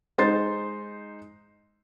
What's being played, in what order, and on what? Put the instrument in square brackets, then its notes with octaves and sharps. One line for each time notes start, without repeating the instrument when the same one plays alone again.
[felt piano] G#3 D#4 C5 C6 A6